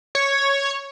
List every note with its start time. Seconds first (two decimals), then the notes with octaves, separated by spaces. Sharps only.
0.15 C#5